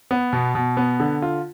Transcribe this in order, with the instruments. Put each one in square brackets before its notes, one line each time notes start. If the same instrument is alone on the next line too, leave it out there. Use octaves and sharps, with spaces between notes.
[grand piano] B3
B2
B2
B3
D3
F4